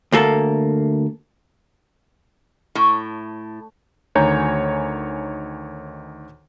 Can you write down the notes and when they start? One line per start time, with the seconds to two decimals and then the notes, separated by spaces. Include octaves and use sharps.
0.12 D2 A#3 A4
2.75 A2
4.15 D2 D#3 C#5 G#5 A#5 G6